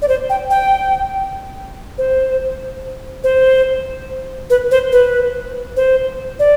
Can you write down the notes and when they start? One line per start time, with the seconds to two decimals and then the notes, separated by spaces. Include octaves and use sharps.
0.02 D5
0.08 C5
0.30 G5
0.50 G5
1.98 C5
3.24 C5
4.50 B4
4.71 C5
4.92 B4
5.76 C5
6.39 D5